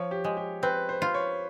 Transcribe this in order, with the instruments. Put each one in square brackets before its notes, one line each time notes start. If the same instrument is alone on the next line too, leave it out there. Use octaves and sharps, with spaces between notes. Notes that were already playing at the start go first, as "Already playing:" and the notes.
Already playing: [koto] F3 [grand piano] C#5
[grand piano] G4
[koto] G#3
[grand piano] G4
[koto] C4 [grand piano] B4
[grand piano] C5
[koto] F4
[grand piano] C#5